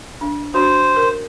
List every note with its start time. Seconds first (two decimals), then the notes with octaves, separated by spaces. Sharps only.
0.21 D4
0.54 D4 F#4 C5
0.96 A#4